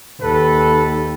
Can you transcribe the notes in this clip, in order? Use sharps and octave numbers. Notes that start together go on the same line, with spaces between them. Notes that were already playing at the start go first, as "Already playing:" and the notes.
D#2 A4 B4